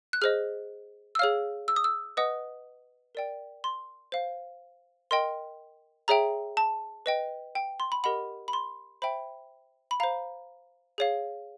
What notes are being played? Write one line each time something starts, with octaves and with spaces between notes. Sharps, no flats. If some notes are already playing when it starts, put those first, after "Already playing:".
F#6
G#4 C5 D#5 F6
E6
G#4 C#5 F5 F6
E6
D#6
E6
B4 D#5 F#5 D#6
A#4 D5 G5
C6
C5 F5
A#4 D#5 G5 C6
G#4 C#5 E5 G5 A#5
A5
B4 D#5 G5
G5
C6
B5
G4 A#4 D#5 F#5 B5
B5
C6
C5 E5 G5 B5
B5
C5 F5 A#5
G#4 C#5 F5